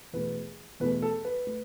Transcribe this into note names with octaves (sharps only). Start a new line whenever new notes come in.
E2 B2 A3 B4
E2 B2 A3 B4
A4
B4
A3